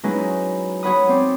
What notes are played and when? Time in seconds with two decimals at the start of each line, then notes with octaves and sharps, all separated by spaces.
0.04 F#3 G#3 C#4 D#4 E4 B4
0.83 F#3 C#5 F#5 B5 D#6
1.09 C4 D5